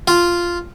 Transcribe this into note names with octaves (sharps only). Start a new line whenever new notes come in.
F4